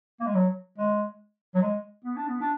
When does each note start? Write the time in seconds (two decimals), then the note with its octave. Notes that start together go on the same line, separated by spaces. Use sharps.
0.20 A#3
0.27 G#3
0.34 F#3
0.78 G#3
1.54 F#3
1.61 G#3
2.05 B3
2.16 D4
2.28 B3
2.40 D4